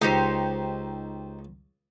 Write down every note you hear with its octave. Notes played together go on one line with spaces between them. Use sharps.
C#2 D#4 G4 C5